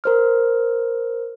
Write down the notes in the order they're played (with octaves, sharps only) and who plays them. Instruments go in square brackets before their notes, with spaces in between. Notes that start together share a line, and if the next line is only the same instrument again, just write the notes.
[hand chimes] A#4 C5 F6